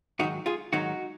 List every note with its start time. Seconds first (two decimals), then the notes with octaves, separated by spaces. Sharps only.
0.19 G#2 D#3 F#3 D#4 F#4
0.46 F4 G#4
0.73 G#2 D#3 F#3 D#4 F#4